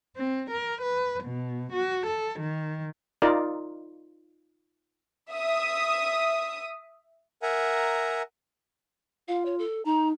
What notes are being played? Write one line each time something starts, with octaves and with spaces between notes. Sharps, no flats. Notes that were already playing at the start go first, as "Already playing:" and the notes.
C4
A#4
B4
B2
F#4
A4
D#3
D#4 F4 A#4 D5
E5 D#6
A#4 E5 F#5 G#5 A#5
F4 F5
C#5
A4
D#4 A#5